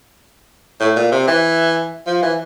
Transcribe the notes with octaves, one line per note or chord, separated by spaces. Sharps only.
A2
A#2
C3
E3
F3
E3